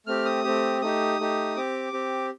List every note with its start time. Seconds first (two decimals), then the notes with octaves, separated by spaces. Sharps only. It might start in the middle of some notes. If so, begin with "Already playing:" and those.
0.06 A3 C4 G4 F6
0.25 D#6
0.44 A3 C4 G4
0.82 A3 D#4 G4 D#6
1.19 A3 D#4 G4
1.56 C4 G4 D6
1.93 C4 G4